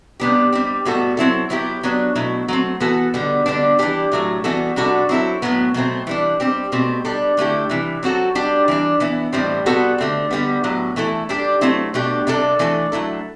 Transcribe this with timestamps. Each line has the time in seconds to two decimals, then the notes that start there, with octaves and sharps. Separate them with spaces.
0.20 C3 G3 B3 D4 G4
0.52 G3 C4 G4
0.85 A2 G3 B3 F#4 A4
1.17 F#3 C4 E4 A4
1.50 F#3 B3 E4 G4
1.83 F#3 B3 D4
2.15 B2 F#3 A3 E4
2.48 F#3 A3 C4
2.80 E3 B3 F#4 A4
3.14 D3 G3 B3
3.46 D3 G3 B3 D4
3.79 E3 G3 D4 G4
4.12 A2 F#3 A3
4.44 E3 G3 B3 F#4 A4
4.76 C3 G3 D4 F#4 A4
5.09 F#3 C4 E4 A4
5.42 A2 F#3 B3
5.74 B2 F#3 A3 C4
6.07 E3 G3 D4
6.40 G3 C4 G4
6.72 B2 A3 C4 G4
7.05 G3 D4 A4
7.37 D3 A3 E4 G4
7.70 C3 E3 G3
8.03 F#3 C4 F#4 A4
8.35 G3 D4 G4
8.68 E3 G3 D4
9.00 E3 B3 E4
9.33 A2 E3 G3 C4
9.66 C3 G3 B3 F#4 A4
9.98 D3 A3 C4
10.31 D3 G3 B3
10.64 A2 F#3 B3
10.96 E3 A3 E4 A4
11.29 G3 D4 G4
11.61 F#3 A3 C4 E4
11.94 B2 A3 D4 G4
12.27 C3 G3 D4 A4
12.59 E3 A3 D4 A4
12.92 F#3 A3 E4 A4